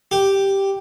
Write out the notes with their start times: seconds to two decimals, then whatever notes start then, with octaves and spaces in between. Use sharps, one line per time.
0.11 G4